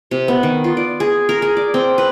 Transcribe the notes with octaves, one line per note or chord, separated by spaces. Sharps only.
C3
B3
D#3
F4
D5
G#4
A#4
G#4
D5
C4
B4